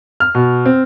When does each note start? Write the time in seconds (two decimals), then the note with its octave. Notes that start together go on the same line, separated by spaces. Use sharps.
0.20 F6
0.35 B2
0.66 C4